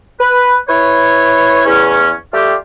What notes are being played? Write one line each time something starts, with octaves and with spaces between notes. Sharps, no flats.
B4
E4 B4 C#5
E2 C#4
G3 A3 F4 G4